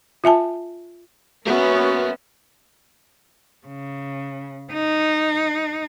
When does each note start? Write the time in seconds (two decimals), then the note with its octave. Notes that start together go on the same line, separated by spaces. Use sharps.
0.24 F4 E5 G#5 A5
1.47 A#3 B3 C#4 F#4 A#4 E5
3.67 C#3
4.72 D#4